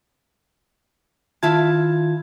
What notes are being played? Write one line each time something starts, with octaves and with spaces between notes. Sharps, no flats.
D#3 E4 F4 F5 A5 G#6